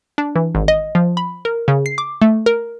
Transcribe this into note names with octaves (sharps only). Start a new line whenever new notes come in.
D4
E3
G#1
D#5
F3
B5
A#4
C#3
C7
D6
A3
A#4